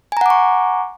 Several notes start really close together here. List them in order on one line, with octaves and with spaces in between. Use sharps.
G#5 A#5 F#5 D6 C#6